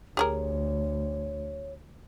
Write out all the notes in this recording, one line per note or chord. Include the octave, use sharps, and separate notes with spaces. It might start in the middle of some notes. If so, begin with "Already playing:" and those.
D2 G4 G#4 A#4 C#5